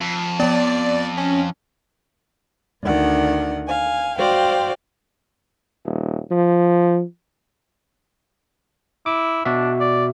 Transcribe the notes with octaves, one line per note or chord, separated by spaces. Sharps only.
F2
F3 B3 D5
C#4
D2 D#3 D5 F#5
F5 G#5
F#4 C5 D5 F5 G5
D#1
F3
E4 D6
B2 D4 F#4 E5
D5